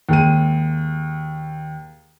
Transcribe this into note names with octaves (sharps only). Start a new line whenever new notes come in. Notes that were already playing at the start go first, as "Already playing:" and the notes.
D#2 G#3 D#7